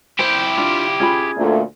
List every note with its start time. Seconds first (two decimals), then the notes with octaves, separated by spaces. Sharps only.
0.19 E4 G4 C5 G5
0.58 D4 F4
1.00 C#4 F4 G#4 B5
1.37 D2 A#2 A3